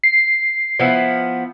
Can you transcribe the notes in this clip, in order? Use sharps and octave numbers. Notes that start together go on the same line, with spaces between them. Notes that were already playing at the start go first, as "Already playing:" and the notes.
C7
F3 B3 E4